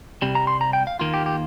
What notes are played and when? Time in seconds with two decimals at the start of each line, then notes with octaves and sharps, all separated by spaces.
0.22 C2 C3 G3
0.35 A#5
0.47 C6
0.61 A#5
0.73 G5
0.87 F5
0.99 D#2 D#3 A#3 F4
1.14 G4
1.26 G4